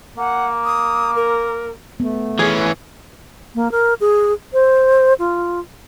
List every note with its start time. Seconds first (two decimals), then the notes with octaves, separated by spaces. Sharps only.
0.18 A#3 F#5
0.65 D#6
1.15 A#4
2.00 A3 B3
2.39 E3 C#4 G#4
3.55 A#3
3.71 A#4
4.01 G#4
4.53 C5
5.19 F4